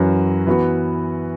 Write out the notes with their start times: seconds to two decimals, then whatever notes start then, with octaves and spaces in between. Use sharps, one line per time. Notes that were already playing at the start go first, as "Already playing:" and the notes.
Already playing: F#2 E3 C#4 F#4
0.47 E3 B3 F#4